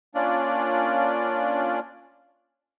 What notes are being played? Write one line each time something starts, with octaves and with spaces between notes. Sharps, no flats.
A#3 C#4 D4 F4 D5